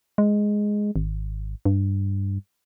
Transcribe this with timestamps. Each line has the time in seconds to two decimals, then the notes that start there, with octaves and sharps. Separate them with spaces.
0.18 G#3
0.96 G#1
1.65 G2